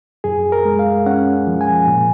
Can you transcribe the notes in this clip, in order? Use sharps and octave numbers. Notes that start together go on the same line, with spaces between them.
F#2 G#4
A#4
G#3
F5
C#4 F#5
F3
G#5
A#2